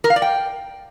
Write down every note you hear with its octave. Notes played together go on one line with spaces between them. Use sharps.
A#4
F5
D5
G5